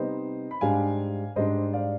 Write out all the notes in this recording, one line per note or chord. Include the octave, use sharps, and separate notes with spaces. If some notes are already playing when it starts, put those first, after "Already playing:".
Already playing: C3 G3 B3 D#4 C5 D#5
B5
G#2 G3 D4 F5 G#5
G#2 G3 D4 C5 D#5
D5 F5